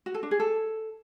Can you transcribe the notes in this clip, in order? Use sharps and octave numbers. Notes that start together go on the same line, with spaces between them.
F#4
A4
D4
G#4
A4